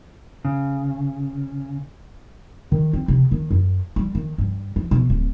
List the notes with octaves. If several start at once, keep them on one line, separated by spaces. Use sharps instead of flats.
C#3
D#3
C4
C3
D#3
F#2
G3
D#3
G2
E3
B2
D1